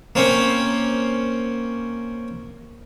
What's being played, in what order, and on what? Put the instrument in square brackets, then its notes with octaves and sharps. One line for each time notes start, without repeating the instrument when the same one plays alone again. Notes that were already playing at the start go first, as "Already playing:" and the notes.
[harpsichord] A#3 C4 C#4